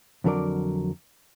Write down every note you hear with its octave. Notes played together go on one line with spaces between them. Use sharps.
F2 D3 F#3 A#4 D5